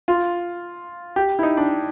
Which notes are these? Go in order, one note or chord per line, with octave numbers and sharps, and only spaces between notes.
F4
G4
E4
D#4
D4